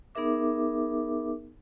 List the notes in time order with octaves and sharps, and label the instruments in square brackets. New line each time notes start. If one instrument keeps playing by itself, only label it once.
[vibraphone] B3 D#4 G#4 A#4 E5 D6